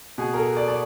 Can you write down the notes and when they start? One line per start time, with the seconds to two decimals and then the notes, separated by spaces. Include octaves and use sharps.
0.18 B2 G#4
0.33 A#4
0.38 A4
0.57 D5
0.68 D5